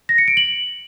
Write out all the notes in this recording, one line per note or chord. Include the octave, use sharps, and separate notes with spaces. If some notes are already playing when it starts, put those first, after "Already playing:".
A#6
C#7
D7
F#7